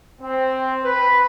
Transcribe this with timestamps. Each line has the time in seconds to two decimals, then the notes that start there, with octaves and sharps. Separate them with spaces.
0.21 C4
0.84 B4